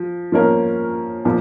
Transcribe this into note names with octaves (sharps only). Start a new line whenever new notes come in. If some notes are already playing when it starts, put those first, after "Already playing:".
Already playing: F3
F3 A#3 C#4 A#4
A#2 F3